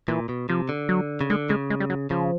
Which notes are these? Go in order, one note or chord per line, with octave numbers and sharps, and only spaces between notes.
A#2 E3
B2
C3 F3
D3
F#3
C#3
D3 G#3
C#3 G#3
G#3
G3
F#3
C#3 F3